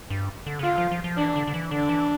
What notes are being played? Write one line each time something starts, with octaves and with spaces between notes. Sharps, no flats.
G2
D3
C#3
D3 F4
F3
F3
F3
E3 D4
D3
D3
E3
D3 D4
E3